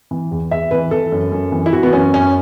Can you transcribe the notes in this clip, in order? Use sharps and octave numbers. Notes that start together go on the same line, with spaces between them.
E3
E2
E2 E5
E3 B4
E3 A4
F#2
F#2
E3
E4
E3 F#4
B3
F#2 C#4
F#2 C#4